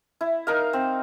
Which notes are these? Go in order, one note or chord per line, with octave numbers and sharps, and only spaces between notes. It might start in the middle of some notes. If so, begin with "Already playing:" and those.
E4
D#4 A#4 F5
C4